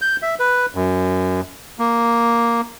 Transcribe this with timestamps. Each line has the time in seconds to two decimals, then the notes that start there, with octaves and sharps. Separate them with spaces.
0.02 G6
0.22 E5
0.40 B4
0.75 F#2
1.79 A#3